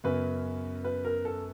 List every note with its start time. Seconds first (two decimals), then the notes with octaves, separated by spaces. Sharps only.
0.04 F#2 C#3 F#3 B3 B4
0.84 B4
1.05 A#4
1.25 A4